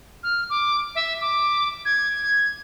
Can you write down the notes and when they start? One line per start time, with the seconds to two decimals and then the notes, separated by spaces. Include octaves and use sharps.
0.23 F6
0.49 D6
0.95 E5
1.20 D6
1.85 G#6